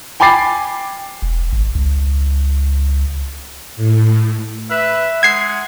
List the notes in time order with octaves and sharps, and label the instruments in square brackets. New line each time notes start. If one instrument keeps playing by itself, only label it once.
[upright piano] G5 G#5 B5 D6 A6 C7
[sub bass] E1
G#1
C#2
[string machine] A2
[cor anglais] B4 [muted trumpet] E5
[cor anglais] G#3 [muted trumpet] F#5 [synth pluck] G#6 C7